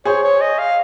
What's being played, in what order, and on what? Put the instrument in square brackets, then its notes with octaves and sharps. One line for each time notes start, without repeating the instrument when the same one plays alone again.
[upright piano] G#4 C5 [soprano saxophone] C#5
[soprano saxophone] C#5
D#5
F5